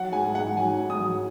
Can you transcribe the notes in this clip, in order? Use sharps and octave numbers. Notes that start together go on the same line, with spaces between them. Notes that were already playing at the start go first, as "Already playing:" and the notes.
Already playing: F#3 F#5
G#2 G#5
G#2 F#5
F#3 G#5
G#2
D#6
F#3